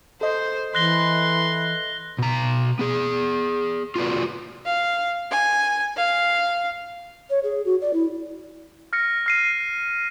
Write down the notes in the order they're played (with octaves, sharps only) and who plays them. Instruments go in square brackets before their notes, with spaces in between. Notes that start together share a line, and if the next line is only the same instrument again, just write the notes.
[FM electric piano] A4 D#5 [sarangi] C5
[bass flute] E3 [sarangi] C6 [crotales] F#6 A#6 G7
[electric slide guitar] B2 A#5
B3 G#4
F4 F#4 B4 D5
[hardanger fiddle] F5
G#5
F5
[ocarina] C#5
G#4
F#4
D5
E4
[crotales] F6 A#6 C#7
F6 C7 D#7